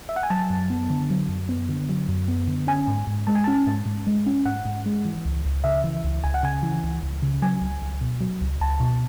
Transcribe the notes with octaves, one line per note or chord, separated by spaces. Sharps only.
E5
F#5
G#5
F#3 A5
F#2
B3
D3
F#3
F#2
B3
D3
F#3
F#2
B3
D3
C#4 G#5
G#2
G#2
G#3 A5
G#5
C#4 A5
G#2
G#2
G#3
C#4
G#2 F#5
G#2
G#3
E3
C#2
C#2
C#3 E5
E3
C#2
C#2 G#5
F#5
C#3 G#5
E3
C#2
C#2
C#3
F#3 G#5
C#2
C#2
B2
F#3
C#2
C#2 A5
B2